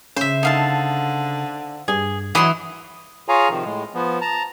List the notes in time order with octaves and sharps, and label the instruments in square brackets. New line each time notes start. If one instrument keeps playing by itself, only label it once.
[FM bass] C#3 [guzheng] C5 E5
[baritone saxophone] D3 [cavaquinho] D#4 F5 A5
[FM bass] G2 [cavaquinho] G#4
[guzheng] E3 C6 [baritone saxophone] F#3 [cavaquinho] E4 D#5 D#6
[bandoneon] F4 G#4 C#5 F5 G#5 A#5
C3 D#3 F3
A2 G#3
F3 B3
A5 A#5